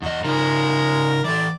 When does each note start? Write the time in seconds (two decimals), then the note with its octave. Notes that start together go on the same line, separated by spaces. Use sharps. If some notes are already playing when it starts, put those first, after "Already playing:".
0.02 E2 F#4 D#5
0.24 C#3 G#3 D#4 F4 A#4
1.24 E3 A4 D5